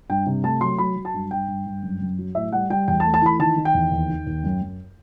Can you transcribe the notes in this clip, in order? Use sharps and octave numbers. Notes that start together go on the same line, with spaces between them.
G2 G5
C3
A3 A5
F#3 C6
F#3 B5
F#3
A5
G2
G2 G5
G2
G2
F#2
F#2
F#3
A2 E5
G3 F#5
G3 G5
E2 G5
A5
A3
A5
E3 B5
D#3 A5
D#3
G5
E2
D#2
D#3
D#2
F#2
F#2